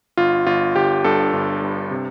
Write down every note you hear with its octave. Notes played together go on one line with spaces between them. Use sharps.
G1 F4
G1 F4
G1 G4
G2 A4
G1
G2
C3